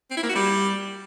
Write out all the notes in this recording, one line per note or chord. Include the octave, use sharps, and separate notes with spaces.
C4
E4
A#3
F#4
G3